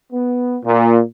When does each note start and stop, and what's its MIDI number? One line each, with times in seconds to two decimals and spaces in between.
0.12 0.57 59
0.64 1.00 46